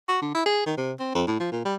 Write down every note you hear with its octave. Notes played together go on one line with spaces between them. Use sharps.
F#4
D3
E4
G#4
D#3
C3
C4
F2
A2
F3
A#2
G3